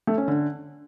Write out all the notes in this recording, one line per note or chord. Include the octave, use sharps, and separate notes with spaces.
A3
C#4
D3